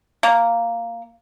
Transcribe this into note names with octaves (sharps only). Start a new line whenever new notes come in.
A#3